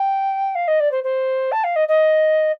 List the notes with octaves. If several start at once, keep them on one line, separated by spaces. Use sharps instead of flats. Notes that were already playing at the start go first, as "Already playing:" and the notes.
Already playing: G5
F5
D#5
D5
C5
C5
A5
F5
D#5
D#5